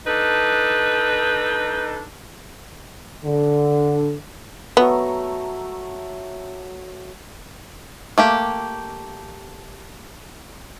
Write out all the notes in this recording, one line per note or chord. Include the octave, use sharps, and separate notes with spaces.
D4 D#4 A4 B4
D3
F#3 A3 B3 A#5
A3 A#3 G4